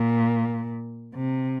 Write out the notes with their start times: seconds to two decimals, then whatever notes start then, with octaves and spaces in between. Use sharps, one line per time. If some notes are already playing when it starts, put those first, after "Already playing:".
Already playing: A#2
1.14 C3